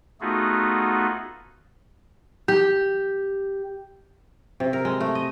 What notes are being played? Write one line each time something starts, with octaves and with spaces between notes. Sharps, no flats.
A3 B3 D#4 F4 F#4 G#4
G4
C3
A#4
G#3
A3
D#5